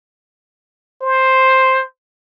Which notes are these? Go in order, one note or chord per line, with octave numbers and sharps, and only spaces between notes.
C5